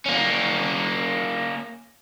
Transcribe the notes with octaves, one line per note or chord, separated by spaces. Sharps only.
A#3 C#4